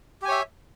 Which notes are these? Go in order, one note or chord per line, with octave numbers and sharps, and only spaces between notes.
G4 C#5 E5 G#5